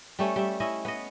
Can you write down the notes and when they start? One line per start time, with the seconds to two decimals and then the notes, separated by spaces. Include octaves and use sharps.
0.19 G3 A3 C#4
0.36 G3 E5
0.60 C#4 E4 D#5
0.85 B3 D#5